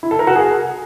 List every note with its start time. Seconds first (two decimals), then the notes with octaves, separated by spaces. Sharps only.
0.03 E4
0.11 A4
0.19 A#4
0.27 F#4
0.35 G#4